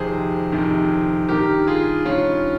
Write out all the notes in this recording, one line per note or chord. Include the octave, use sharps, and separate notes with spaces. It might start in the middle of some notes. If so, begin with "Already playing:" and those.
Already playing: F2 C3 D#3 G#4 C5
F2 C3 D#3
G2 D#3 G4 A#4
F4 G#4
G2 D#3 C#4 F4